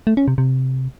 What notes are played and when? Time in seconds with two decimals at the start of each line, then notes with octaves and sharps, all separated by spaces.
0.07 A3
0.17 C#4
0.28 C3
0.38 C3